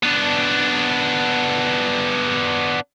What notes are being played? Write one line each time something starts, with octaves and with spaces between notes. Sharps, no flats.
B3 D4